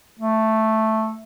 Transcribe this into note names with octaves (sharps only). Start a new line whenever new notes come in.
A3